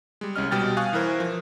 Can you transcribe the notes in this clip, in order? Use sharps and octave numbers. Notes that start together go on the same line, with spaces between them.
G3 G#3
C2 C#4 D#5 F6
B2 G3 G5 F6 A6
F5 G#5 C#6 D#6 F#6
E3 E4 A#4 C5
F3